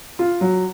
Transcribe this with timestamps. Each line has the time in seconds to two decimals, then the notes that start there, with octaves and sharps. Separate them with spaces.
0.19 F4
0.41 F#3